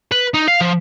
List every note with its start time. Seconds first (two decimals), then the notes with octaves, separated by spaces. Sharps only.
0.12 B4
0.34 D#4
0.48 F5
0.61 F3